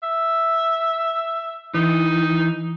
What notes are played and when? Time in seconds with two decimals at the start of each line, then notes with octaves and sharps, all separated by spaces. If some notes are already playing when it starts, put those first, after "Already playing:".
0.03 E5
1.74 E3 D#4